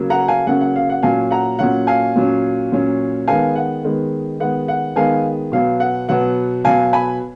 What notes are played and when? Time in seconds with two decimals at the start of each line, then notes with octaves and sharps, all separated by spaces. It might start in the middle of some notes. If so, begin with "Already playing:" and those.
Already playing: C#3 F#3 A#3 C#4
0.10 F#5 A#5
0.28 F5 G#5
0.47 C#3 F#3 A#3 C#4 F#5
0.61 F#5
0.76 F5
0.90 F#5
1.03 A#2 F#3 C#4 F5 G#5
1.31 F#5 A#5
1.59 A#2 F#3 C#4 F#5
1.87 F5 G#5
2.16 A#2 F#3 C#4
2.72 A#2 F#3 C#4
3.28 D#3 G#3 B3 F5 G#5
3.56 F#5
3.84 D#3 G#3 B3
4.40 D#3 G#3 B3 F#5
4.68 F#5
4.96 D#3 G#3 B3 F5 G#5
5.52 B2 F#3 B3 F5
5.80 F#5
6.08 B2 F#3 B3 F#5
6.64 B2 F#3 B3 F5 G#5
6.93 G#5 B5